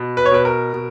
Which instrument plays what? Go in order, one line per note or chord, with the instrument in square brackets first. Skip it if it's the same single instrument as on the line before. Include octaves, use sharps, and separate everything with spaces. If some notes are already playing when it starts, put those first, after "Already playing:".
Already playing: [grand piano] B2
B4
C#5
B2 B4
A#4
B2